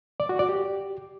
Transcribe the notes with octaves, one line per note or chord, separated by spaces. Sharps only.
D5
F#4
D5
G4